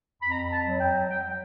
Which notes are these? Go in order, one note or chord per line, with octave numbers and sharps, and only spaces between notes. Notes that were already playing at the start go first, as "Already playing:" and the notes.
F2 B5
A#5
B5
A5
F#3
G5
F#3 G5